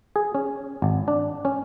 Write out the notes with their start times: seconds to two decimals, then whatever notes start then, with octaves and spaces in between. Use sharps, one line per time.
0.16 G#4
0.35 C#4
0.82 G#1
1.08 D4
1.45 C#4